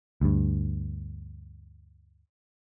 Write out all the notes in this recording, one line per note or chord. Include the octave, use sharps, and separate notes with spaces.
D2 G2